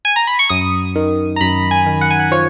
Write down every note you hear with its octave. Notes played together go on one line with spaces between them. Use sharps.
G#5
A#5
B5
C#6
F#2 D#6
D#3
A#5
F#2 B5
G#5
D#3
F#5
G#5
F#5
F3 C#5